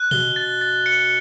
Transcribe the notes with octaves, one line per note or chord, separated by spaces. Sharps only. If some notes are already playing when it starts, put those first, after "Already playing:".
Already playing: F#6
B2 G7
A6
A6
C#7